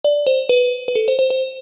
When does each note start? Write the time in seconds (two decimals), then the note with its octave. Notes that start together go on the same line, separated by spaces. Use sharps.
0.04 D5
0.27 C5
0.49 B4
0.88 B4
0.95 A4
1.08 C5
1.19 C5
1.30 C5